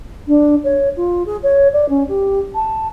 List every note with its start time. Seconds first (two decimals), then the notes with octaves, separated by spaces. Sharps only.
0.27 D4
0.64 C#5
0.96 F4
1.26 G#4
1.43 C#5
1.73 D5
1.89 C#4
2.08 G4
2.55 A5